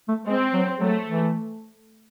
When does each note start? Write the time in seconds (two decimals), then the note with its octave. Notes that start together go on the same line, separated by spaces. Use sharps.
0.08 A3
0.27 G#3 C4
0.53 F#3
0.80 F#3 A3
1.07 E3